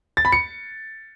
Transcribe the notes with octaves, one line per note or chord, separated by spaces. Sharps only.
A6
B5
C#7